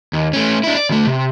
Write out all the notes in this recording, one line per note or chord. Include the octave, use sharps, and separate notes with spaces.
D#2
A3 C#4
D4 E4
D5
D2 A3
C3